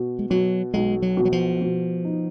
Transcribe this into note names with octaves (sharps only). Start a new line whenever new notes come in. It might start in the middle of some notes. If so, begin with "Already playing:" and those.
Already playing: B2
G#3
B2 F#3
B1 G#3
F#3
B2
F#3
F3
B2
D#4